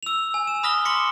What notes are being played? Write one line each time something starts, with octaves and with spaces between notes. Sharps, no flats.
E6 F7
G#5
E7
B5 D#6 F6 A#6 B6 G7
C6 D6 A#6 B6 C#7 G7